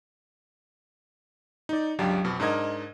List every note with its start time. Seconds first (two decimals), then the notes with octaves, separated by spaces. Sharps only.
1.69 D#4 D5
1.99 G1 C#2 F#3 D4 G4 F5
2.24 F2 B2
2.40 G#2 D4 A#4 D#5 G#6